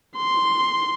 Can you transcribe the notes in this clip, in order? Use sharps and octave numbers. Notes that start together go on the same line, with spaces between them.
C6